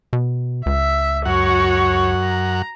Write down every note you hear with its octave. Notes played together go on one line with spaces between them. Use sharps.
B2
C#2 E5
F#2 F#4 C#5 F#5
A#5